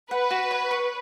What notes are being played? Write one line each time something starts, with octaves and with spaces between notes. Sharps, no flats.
B4 F#5
F#4
C#5
C#6